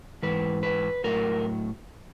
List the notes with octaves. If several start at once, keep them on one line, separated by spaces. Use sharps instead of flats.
G#2 E3 B4
B4
A2 F#3 A#4